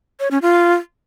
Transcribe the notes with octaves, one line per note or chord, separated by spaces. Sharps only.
C#5
C#4
F4